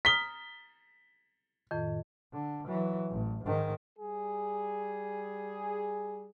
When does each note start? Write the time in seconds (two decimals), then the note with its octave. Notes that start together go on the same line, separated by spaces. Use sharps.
0.05 A#5 D#6 F6 B6 G7
1.71 F2 A2 D#3
2.33 D3
2.67 E3 F#3
3.10 A1
3.44 G#2 D#3
3.99 G3 G#4